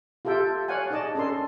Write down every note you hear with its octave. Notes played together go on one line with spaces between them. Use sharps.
F4 G4 A4 E5 G5
C#5 D5 F5 F#5 G#5
D#4 G#4 D5 D#5 A5
C#4 D4 A4 A#4 C6